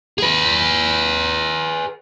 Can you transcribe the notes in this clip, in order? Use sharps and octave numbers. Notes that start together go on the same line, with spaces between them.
G#4 B4